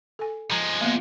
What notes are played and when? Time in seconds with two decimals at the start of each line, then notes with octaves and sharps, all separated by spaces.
0.19 A4 G#5
0.51 F3 G#3 A#5
0.81 A#3 B3